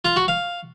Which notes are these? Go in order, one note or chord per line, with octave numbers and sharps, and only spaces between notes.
F4
F#4
F5